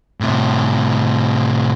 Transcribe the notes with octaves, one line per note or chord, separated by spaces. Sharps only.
A2 C3